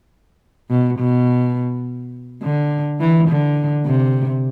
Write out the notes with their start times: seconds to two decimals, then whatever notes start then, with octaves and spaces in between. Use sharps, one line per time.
0.70 B2
0.99 B2
2.42 D3
3.00 E3
3.29 D3
3.86 C3